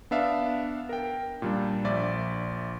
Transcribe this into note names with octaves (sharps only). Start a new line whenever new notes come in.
B3 D4 E5 F5
A#4 G5
A#2 G3 D4
A#1 D5 E5